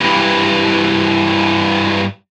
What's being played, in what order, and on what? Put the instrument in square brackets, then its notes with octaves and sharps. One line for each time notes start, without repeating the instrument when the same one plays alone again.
[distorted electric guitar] G2 E3